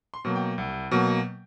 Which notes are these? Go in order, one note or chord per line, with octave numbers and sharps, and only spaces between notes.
C6
B2 F#3 A#3
G5
C2
B2 F#3 A#3